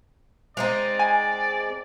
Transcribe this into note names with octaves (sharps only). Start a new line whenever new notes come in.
G#3 C4 D#4 D5
G#5